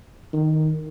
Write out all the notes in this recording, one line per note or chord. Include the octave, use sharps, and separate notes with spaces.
D#3